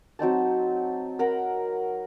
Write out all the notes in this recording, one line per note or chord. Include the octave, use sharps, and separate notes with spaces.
F#3 C4 D#4 A5
A#4 F#5 A#5 B5